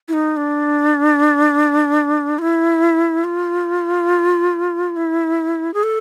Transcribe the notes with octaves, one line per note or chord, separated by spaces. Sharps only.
E4
D#4
D4
F4
E4
F4
E4
G#4
A4